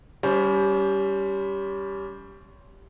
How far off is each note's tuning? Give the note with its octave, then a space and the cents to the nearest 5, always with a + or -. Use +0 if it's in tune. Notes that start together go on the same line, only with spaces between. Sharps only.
G3 +0 C#4 +30 C5 +0